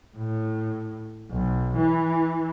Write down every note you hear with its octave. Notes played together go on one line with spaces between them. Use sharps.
A2
B1
E3